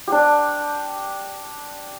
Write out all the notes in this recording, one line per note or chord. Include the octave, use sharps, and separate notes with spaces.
D4 G4